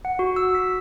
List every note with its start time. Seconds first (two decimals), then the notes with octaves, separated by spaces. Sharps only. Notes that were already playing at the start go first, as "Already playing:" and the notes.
0.05 F#5
0.19 F#4
0.36 E6
0.54 B6